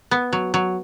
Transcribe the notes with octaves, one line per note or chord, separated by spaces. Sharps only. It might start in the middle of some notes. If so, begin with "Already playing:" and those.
B3
F#3
F#3